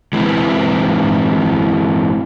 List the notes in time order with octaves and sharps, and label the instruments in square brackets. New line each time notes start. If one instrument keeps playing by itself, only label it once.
[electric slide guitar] E3 G#3 C4 E4 B4